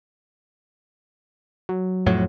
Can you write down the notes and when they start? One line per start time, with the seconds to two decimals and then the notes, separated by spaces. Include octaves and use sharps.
1.69 F#3
2.06 F2 A2 F#3